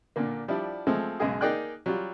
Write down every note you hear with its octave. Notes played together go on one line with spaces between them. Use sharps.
A#2 D3 A#3
F3 G3 D4 E4
F3 G#3 A3 C4
B1 F#2 C#3 G#3 G#4 D#5
A#3 D#4 G#4 D5 G5 F#6
F#3 G3 F4